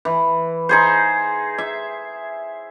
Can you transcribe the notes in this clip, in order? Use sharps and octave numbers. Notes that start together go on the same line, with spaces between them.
E3
D#4 G#4 C5
E5